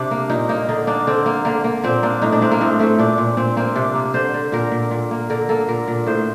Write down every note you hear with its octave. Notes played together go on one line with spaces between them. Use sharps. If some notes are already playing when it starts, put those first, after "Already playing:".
Already playing: C3 D4
A#3
A#2 D#4
A#3 D#4
D3 D#4
A#3 D4
D3 C4
A#3
D3 A#3
A#3
A#2 C4
A#3 D4
A2 D#4
D4
A2 C4
A#3
A2 C4
A3 C4
A#2 D4
A#2
A#2 C4
A#3 C4
C3 D4
A#3
D3 C5
D3
A#2 A#4
A#2
A#2
A#3
D3 A#4
A#3 A4
A#2 A#4
A#2
A2 C5